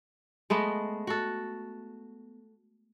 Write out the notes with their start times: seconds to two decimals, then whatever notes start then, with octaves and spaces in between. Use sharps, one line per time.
0.50 G#3 A3 B3 D#5
1.07 F#4 A4